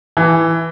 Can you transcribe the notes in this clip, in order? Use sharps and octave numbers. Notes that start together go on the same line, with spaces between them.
E3